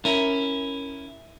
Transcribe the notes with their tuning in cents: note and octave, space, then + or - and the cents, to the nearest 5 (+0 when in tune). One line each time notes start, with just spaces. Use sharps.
C#4 +0 E4 +0 A#4 +0